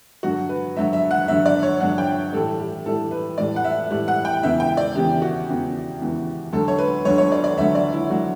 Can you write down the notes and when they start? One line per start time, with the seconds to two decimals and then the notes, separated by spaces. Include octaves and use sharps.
0.23 G2 D3 F#3 F#4
0.49 B4
0.76 G2 D3 F#3 E5
0.93 E5
1.11 F#5
1.28 G2 D3 F#3 E5
1.46 D5
1.63 C#5
1.80 G2 D3 F#3 F#5
1.98 G5
2.33 A2 E3 G3 A4
2.59 G4
2.86 A2 E3 G3 A4
3.11 B4
3.38 A2 E3 G3 D5
3.56 F#5
3.64 E5
3.91 A2 E3 G3
4.08 F#5
4.25 G5
4.43 E2 C#3 E3 E5
4.60 G5
4.77 D5
4.95 E2 C#3 E3 G4
5.22 F#4
5.48 E2 C#3 E3
6.01 E2 C#3 E3
6.52 D2 D3 F#3 A4
6.68 C#5
6.78 B4
7.05 D2 D3 F#3 C#5
7.18 C#5
7.32 D5
7.44 D5
7.57 D2 D3 F#3 E5
7.75 D5
7.93 E4
8.10 D3 F#3 F#4